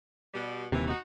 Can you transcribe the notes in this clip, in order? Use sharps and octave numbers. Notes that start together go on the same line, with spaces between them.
B2 G3
D#1 D#2 C3 E3
D#4 F#4